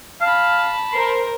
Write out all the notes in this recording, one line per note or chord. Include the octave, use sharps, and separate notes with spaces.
F5 A5 B5
A#4 C5 C6